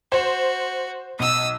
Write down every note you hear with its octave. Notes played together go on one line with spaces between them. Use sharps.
F#4 C5
B1 D#6 E6